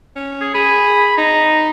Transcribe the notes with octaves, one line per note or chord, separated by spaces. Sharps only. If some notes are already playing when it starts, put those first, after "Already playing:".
C#4
G#4
G#4 B5
D#4 A#5